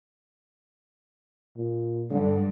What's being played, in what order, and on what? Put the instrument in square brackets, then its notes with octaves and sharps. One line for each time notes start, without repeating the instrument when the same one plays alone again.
[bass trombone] A#2
[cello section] G2 [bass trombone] D3